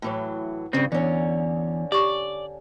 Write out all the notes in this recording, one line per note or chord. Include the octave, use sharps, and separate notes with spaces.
A2 E3 F#3
D2 G2 C#3 C4
E2 D3 C#4
G4 D5 C#6